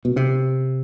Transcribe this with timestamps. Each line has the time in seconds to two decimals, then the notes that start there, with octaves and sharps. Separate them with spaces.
0.05 B2
0.16 C3